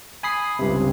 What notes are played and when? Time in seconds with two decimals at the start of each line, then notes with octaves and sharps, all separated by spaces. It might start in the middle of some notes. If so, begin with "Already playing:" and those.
0.23 G#5 B5 D#6 C7
0.59 C#2 G2 C3